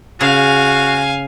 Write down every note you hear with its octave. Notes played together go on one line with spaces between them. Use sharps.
C#3 F#4 F5 G#5